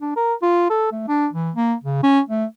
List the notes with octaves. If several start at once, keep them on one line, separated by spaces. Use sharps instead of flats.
D4
A#4
F4
A4
A3
D4
E3
A#3
C#3
C#4
A3